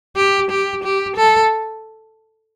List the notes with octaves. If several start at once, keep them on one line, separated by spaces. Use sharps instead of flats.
G4
G4
G4
A4